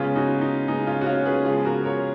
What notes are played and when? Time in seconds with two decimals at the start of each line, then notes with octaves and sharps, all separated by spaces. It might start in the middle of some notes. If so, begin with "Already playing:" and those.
Already playing: C#3 G#3 B3 C#4 F4
0.15 D#4 F#4
0.41 D#4
0.68 C#3 G#3 B3 D#4
0.87 C#4 F4
1.01 F#4
1.06 C#4 F4
1.26 G#4 B4
1.45 C#3 F3 G#3 B3 F4 G#4
1.65 F#4 A#4
1.84 A#4 C#5